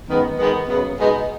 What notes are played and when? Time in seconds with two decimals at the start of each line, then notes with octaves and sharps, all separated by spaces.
0.08 F#2 D#3 G#3 B3
0.38 D#3 G#3 B3
0.67 F#2 C#3 F#3 B3
0.97 B2 G#3 B3 D#4